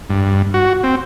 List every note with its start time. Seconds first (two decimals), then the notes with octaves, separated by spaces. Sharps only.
0.10 G2
0.54 F#4
0.83 C4